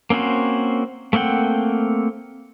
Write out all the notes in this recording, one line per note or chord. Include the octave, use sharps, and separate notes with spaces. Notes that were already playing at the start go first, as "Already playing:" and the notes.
A#3 C4 C#4 F#4 C5
A3 A#3 C4 F#5 G5